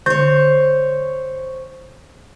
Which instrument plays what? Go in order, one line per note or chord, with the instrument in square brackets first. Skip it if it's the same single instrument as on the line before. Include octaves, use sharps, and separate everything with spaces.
[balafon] D3 [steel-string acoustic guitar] C5 C#5 [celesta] G6